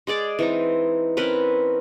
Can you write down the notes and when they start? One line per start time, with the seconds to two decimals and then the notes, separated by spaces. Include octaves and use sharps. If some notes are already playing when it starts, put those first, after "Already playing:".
0.07 G#3 G#4 D5 D6
0.39 E3 C4 D#4
1.17 C4 C#4 A#4 B4